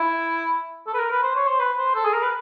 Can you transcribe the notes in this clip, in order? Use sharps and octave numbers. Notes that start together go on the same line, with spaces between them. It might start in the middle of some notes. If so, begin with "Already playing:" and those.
Already playing: E4
A4
B4
A#4
B4
C5
C#5
C5
B4
C5
A4
G#4
A#4
B4